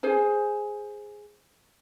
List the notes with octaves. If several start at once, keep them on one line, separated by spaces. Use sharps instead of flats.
G#4 C5 G#5